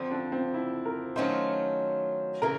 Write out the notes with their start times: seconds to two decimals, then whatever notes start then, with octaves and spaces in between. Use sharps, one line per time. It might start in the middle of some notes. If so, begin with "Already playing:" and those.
Already playing: F2 D3 F3 C4
0.11 D4
0.32 C4
0.54 E4
0.85 A#4
1.16 D#3 F#3 A3 C#4 F4 C5
2.42 C#3 E3 A#4